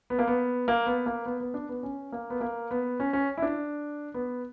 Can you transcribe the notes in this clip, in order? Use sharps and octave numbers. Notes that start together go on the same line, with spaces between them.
B3
A#3
B3
A#3
B3
A#3
B3
B3
D4
B3
C#4
A#3
B3
A#3
B3
C#4
C#4
E4
D4
B3